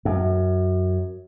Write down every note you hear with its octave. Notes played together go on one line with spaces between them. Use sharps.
F#2